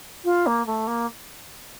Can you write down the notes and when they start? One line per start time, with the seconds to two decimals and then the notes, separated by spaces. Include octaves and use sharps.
0.24 F4
0.46 A#3
0.66 A3
0.87 A#3